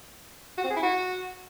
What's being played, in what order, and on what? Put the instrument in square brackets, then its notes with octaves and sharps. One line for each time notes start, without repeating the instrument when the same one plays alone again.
[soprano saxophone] F#4
C4
G#4
E4
F#4